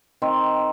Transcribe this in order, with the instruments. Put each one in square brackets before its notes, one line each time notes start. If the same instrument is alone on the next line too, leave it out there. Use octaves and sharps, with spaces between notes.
[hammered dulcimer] D#3 C4